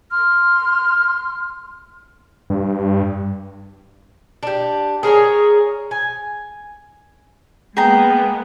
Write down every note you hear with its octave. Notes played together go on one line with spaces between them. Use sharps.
C6 F6
G2
D4 G4
G#4 A#4 C5 C#5
G#5
G#3 A#3 B3 G#4 G5 A#5